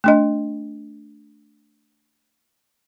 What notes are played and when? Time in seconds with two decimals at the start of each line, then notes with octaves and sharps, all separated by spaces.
0.04 A3 D4 D#5